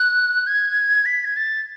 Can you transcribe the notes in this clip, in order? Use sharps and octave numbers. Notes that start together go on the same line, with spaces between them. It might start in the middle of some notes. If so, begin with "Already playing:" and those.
Already playing: F#6
G#6
B6
G#6
A6